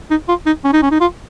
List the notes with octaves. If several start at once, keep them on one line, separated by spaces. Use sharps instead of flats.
D#4
F4
D#4
C#4
D#4
C#4
D#4
F4